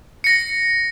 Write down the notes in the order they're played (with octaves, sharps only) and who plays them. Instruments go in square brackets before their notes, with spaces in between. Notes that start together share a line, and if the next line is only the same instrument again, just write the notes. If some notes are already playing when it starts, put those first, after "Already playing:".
[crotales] A#6 C#7